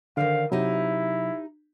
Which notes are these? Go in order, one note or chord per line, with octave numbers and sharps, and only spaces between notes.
D3 D#3 C5 D5 F5
C3 F#3 D#4 E4 G4 C5